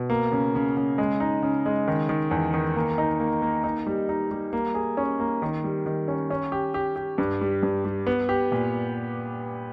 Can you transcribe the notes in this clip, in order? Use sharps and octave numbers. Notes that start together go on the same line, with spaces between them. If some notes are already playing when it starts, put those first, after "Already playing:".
Already playing: B2
A#3
C#3
C#3
C#3
G#3
D#4
C#3
G#3
D#3
D#3
E2
D#3
A#3
D#4
A#3
A#3
D#4
G3
D#4
G3
A#3
G#4
C#4
A#3
D#3
G3
D#3
C#4
C#4
G4
G4
G4
G2
G3
G2
G3
B3
G4
A#2